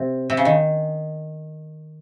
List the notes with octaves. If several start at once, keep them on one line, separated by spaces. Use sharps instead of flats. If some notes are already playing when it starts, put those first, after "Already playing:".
Already playing: C3
C3
C#3
D#3